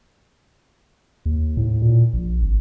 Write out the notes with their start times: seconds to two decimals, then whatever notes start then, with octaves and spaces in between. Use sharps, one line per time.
1.26 D#2
1.57 A2
1.82 A#2
2.13 A#1
2.42 G#1